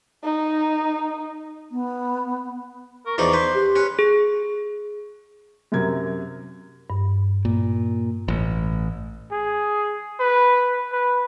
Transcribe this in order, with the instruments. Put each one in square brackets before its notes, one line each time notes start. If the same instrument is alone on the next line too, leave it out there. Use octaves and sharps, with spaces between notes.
[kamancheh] D#4
[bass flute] B3
[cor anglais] A#4 [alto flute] C#6
[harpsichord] E2 F3 D#4 [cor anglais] D5 [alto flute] C#6
[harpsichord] B4 [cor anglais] C5
[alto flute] G4
[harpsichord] C#4 [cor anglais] B4
[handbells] G#4
[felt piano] F#2 C3 A#4 G#6
[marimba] G2
[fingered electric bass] A#2
A1
[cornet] G#4
B4
B4